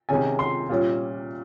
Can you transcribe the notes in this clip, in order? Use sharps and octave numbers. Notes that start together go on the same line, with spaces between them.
C3 D#3 G#3 C#4 G#5
C6
A#2 G3 C#4